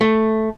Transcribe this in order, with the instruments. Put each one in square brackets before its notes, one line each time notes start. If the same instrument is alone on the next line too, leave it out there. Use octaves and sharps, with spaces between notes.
[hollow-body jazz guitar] A3